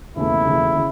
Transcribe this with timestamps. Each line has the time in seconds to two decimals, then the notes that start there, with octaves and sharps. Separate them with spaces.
0.16 E1 D#2 C#3 E3 A3 E4
0.45 E1 D#2 C#3 E3 A3
0.75 C#3